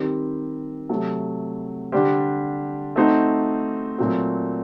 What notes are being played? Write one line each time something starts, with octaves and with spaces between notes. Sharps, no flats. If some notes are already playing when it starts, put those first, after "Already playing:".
Already playing: D#3 G3 C4 G4
C3 F#3 A3
D3 G3 D4 G4 C5
A3 C4 D#4 F#4 C5
A#2 F#3 A3 C4 F#4